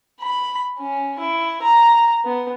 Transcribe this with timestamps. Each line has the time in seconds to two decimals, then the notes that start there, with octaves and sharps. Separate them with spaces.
0.20 B5
0.79 C#4
1.19 E4
1.62 A#5
2.25 B3